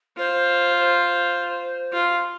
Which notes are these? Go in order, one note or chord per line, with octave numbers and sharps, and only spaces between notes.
F4 C5
C5
F4